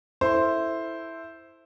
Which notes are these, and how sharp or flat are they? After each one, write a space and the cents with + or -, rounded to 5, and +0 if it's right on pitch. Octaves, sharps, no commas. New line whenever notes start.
E4 +0 A4 +5 C5 +0